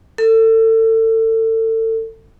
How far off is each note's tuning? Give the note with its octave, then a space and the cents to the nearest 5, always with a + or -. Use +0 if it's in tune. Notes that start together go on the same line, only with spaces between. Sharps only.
A4 +30